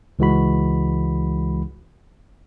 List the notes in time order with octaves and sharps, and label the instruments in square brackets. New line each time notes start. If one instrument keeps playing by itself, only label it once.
[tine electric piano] C#2 E3 G#3 F#4 B5